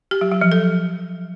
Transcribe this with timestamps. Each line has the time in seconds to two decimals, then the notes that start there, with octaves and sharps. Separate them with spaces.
0.11 G4
0.21 F#3
0.31 F#3
0.41 F3
0.52 A4